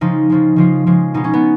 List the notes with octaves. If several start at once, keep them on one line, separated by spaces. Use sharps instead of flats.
C#3 F3 G#3 D#4
C#3 F3 G#3
C#3 F3 G#3 F4
C#3 F3 G#3
B2 G#3 D#4
C#4
B3